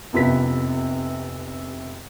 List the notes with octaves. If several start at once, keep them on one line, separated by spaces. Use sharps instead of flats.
F1 F#2 C3 B3 F4 B6